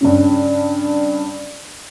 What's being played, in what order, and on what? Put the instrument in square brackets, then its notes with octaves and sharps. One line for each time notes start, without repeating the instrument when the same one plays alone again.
[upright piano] G2 C#3 C#4